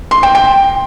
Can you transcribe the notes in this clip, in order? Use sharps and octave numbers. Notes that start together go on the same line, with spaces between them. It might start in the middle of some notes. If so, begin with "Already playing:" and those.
C6
G5
G5